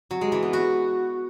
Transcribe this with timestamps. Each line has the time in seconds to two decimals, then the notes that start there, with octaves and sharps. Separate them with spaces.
0.11 F#3
0.21 G#3
0.32 E3
0.43 B3
0.53 F#4